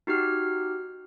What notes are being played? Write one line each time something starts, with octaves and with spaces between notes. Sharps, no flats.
D#4 F#4 G4 F6